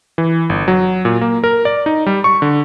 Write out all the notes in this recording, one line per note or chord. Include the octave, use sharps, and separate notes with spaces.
E3
G1
F#3
A#2
A#3
A#4
D5
D#4
G3
C#6
D3